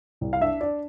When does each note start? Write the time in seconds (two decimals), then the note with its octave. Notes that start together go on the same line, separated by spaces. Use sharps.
0.21 C2
0.33 F5
0.41 D4 E5
0.60 D4 D5